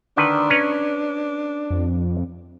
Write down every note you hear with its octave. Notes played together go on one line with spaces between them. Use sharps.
D3 D#3 D4 B4
C#4 B4 A#5
F2